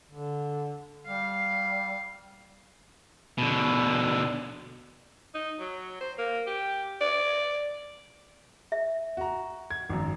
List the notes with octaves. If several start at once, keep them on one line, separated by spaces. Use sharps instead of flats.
D3
G3 F5
B2 D3
D#4
F#3
C5
A#3
G4
D5
E5
F#4 A#5
G#6
G#1 F#2